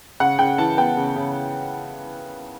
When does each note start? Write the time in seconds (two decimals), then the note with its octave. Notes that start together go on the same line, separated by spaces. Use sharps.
0.20 C#3 F#5
0.38 C#3 G5
0.58 E3 A5
0.77 B3 G5
0.97 C#3
1.16 C#3